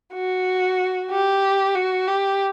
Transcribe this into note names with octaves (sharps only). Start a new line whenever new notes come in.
F#4
G4
F#4
G4